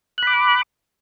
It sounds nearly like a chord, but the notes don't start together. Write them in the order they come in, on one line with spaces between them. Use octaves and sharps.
F#6 B5 D6